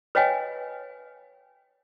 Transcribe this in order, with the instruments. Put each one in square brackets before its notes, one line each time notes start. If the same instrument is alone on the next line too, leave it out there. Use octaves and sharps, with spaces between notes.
[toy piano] B4 C#5 D#5 F5 G5 G#5